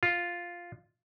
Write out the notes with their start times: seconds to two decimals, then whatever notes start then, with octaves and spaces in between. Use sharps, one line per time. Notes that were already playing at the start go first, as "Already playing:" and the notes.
0.03 F4